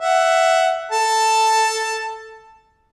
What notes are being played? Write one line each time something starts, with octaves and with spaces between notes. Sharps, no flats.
E5 F#5
A4 A5